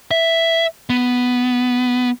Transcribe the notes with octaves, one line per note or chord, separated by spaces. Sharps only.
E5
B3